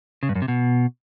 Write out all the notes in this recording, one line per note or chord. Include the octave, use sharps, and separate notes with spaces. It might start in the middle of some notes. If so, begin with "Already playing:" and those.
C#3
G2
F#2
C3
B2